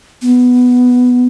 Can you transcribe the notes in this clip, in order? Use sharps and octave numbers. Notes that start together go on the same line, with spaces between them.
B3